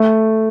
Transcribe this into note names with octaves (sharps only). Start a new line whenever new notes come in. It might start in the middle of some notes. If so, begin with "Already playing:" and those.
Already playing: A3